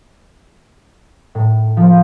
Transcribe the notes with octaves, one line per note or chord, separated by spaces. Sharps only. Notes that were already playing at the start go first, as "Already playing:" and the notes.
A2
F3